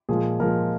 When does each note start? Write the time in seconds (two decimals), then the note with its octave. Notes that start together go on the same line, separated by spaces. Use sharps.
0.09 A#2 F3 G#3 G#4
0.40 A#2 F3 G#3 A#4